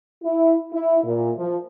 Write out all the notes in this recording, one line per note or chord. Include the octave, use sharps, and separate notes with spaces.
E4
E4
A#2
F3